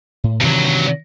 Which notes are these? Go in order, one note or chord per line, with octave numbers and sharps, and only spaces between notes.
A2
G2 C3 D#3 E3 F#3